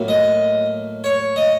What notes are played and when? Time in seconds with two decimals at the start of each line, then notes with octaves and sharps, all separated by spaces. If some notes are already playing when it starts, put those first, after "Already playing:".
Already playing: A2 F#3 A#3
0.08 D#5
1.04 C#5
1.36 D#5